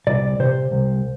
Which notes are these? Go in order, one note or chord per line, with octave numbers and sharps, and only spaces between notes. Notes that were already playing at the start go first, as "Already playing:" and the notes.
C2 D5
C3 C5
C2